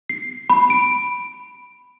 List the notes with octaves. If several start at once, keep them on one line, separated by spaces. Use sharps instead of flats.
C7
B5
D7